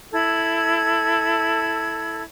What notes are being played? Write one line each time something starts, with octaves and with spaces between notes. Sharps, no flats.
E4 A4 G#6